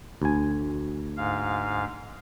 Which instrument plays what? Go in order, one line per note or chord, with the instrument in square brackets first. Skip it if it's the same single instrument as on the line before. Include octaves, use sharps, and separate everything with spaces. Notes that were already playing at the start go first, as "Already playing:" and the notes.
[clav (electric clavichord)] D2 G#5
[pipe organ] G#2 F5